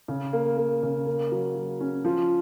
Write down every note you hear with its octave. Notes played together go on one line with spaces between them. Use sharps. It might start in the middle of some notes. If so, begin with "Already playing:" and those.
C#3
A#3
A#3
C#3
A#3
F#3
F#3
C#4
F3